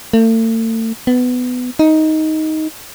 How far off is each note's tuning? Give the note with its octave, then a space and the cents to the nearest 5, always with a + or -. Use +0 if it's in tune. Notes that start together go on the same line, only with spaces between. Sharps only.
A3 +40
B3 +15
D#4 +10